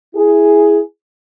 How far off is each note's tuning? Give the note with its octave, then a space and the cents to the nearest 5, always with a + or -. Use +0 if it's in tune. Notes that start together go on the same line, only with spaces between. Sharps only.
E4 +0 G#4 +0